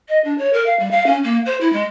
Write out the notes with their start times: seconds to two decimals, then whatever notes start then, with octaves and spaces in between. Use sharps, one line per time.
0.08 D#5
0.24 D4
0.38 C#5
0.53 A#4
0.66 F5
0.79 G3
0.91 F5
1.06 C#4
1.24 A#3
1.45 C5
1.61 E4
1.72 G#3